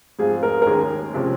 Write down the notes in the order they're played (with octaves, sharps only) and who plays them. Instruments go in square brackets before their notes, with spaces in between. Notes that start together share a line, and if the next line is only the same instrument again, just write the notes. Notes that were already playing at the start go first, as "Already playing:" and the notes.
[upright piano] G#2 F3 C4 F4 [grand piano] G#4
[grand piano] A#4
A#4
[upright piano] D#2 D#3 G#3 C#4 [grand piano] G#4
[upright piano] C3 F3 G#3 C#4